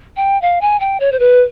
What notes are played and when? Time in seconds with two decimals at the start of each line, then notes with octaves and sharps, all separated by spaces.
0.16 G5
0.42 F5
0.61 G#5
0.80 G5
1.00 C#5
1.12 C5
1.19 B4